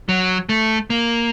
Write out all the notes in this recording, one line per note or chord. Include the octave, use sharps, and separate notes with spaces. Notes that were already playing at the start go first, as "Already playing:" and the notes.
F#3
A3
A#3